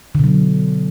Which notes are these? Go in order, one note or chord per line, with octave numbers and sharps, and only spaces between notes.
B2 D3 F#3